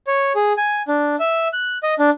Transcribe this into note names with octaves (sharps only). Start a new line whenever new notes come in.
C#5
G#4
G#5
D4
E5
F#6
D#5
D4